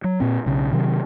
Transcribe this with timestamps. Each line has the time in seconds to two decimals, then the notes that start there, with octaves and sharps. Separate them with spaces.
0.04 F#3
0.20 A#2 C4
0.46 B1 C#3
0.73 C3 D#3 F#3